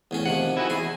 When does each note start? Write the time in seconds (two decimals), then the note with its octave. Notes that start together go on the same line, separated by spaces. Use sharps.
0.11 E2 A2 C#4
0.26 C3 D#3 F3 F#5
0.57 E4 F#4 G#4
0.70 E2 G#4